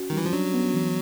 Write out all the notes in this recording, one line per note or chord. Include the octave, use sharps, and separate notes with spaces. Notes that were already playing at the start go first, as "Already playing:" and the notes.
Already playing: C#4 F#4
D#3 G3
E3
F3
F#3 D4
B3
E3